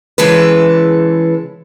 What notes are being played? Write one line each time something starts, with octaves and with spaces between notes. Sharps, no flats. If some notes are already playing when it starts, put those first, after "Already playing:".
C#3 E3 G#3 A4 B4